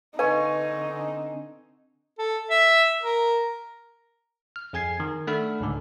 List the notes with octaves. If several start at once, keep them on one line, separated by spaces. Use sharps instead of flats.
D3 C4 D#4 B4 F5 G#5 C#6
A4
E5
A#4
F6
F2 G#4 G#5 G#6 C7
D#3
A3 D4 A4 F#5 B5 F6
C#2 G#2 D3